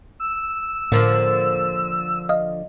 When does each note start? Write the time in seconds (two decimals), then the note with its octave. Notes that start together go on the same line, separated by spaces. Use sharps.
0.20 E6
0.92 A2 D3 F3 A#3
2.29 D#5 F5